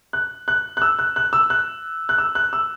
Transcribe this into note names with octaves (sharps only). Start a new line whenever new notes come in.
F#6
F#6
F#6
E6
F#6
F#6
E6
F#6
F#6
E6
F#6
E6